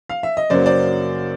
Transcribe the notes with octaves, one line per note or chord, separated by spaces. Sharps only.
F5
E5
D#5
F#2 C#3 F#3 A#3 C5 D5
C5 D5